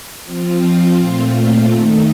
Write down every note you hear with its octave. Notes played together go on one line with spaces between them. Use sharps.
F3 C4 F4
A#2 A3 C4 F4
D#3 A3 D#4